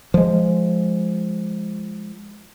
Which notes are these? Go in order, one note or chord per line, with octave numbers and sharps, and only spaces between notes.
F3 G#3